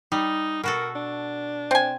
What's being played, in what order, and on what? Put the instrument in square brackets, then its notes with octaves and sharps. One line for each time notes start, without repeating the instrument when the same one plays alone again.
[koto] G3 [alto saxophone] D#4
[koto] B2 F#4 A4 [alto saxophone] A#4
[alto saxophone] D4
[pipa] C4 G#5